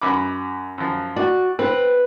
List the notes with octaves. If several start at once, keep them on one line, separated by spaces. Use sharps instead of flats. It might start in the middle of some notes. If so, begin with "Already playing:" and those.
F#2 B5 D6
F#2 F3
F#4 D5
C4 B4